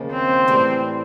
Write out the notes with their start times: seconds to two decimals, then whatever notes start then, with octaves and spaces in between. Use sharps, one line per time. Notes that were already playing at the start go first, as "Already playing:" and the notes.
Already playing: D#2 C#3 F3 A#3
0.11 C4
0.48 A2 E3 G3